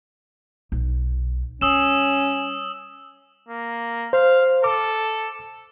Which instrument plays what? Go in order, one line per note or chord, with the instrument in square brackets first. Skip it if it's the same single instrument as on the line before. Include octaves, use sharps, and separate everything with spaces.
[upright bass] B1
[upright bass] G3 [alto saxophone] C#4 [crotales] D#6 E6 E7
[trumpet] A#3
[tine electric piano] C5 [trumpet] F5
[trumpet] A4 [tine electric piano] D6